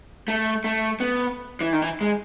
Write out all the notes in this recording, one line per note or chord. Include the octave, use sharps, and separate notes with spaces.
A3
A3
B3
E3
D#3
E3
G#3